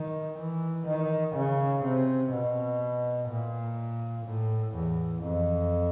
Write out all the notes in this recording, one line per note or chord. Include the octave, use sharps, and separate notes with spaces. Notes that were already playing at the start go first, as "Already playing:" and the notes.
Already playing: D#3
E3
D#3
C#3
C3
B2
A#2
A2
E2
F2